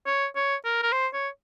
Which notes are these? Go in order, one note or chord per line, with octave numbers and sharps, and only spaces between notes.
C#5
C#5
A#4
A#4
C5
C#5